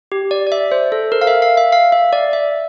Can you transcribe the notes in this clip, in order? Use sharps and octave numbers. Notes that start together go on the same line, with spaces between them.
G4
D5
D5
E5
C5
A4
A#4
F5
E5
F5
E5
F5
E5
D5
E5